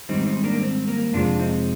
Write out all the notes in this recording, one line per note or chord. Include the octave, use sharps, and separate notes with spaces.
G#2 D#3 G3 C4 D#4
C4 D#4
A#3 D4
C4
A#3
F2 C3 F3 G#3 D4 F4
C4 D#4